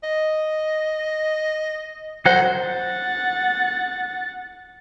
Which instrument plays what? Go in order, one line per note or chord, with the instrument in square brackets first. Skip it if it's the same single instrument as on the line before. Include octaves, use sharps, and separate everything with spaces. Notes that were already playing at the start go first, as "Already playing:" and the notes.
[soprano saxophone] D#5
[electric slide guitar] F#3 F#5 [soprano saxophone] C5
[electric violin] F#5 A6